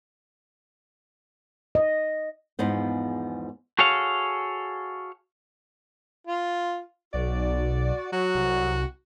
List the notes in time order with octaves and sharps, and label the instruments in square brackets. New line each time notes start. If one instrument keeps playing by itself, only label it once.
[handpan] D#5
[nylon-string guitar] E2 G#2 F3 B3 C5
[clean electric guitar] F#4 G#4 A4 C#5 F5
[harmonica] F4
[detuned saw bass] B1 [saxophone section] F#4 D5
[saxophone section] F#3 [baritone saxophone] F#4
[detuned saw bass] C2